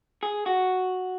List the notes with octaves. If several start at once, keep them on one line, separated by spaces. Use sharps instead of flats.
G#4
F#4